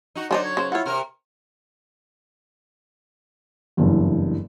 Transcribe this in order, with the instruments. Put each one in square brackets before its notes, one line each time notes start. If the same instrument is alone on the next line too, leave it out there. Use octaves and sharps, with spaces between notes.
[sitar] D#4 F#4
[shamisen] D3 C#4 D#4 [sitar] F#3 [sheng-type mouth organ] C5 D5
[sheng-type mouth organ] C#5
[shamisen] C#3 C5
[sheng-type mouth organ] E4 F4 [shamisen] C#5 F#5
[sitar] C3 A#4 [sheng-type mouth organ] F6
[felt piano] F#1 E2 G2